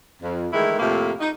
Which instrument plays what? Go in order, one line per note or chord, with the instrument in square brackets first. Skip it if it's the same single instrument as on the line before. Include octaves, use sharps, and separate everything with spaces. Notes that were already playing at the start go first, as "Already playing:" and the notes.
[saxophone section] F2
D#3 E3 G#3 A3 E4
F2 A2 C3 A3 A#3
D#4